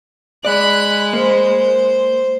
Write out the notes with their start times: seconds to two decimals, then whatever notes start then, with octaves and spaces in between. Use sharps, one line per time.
0.45 G#3 D5 B5 F#6
1.13 A#3 C5